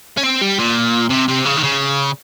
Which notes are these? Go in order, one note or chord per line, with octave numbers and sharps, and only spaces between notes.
C#4
C4
G3
A#2
C3
C3
C#3
D#3
C#3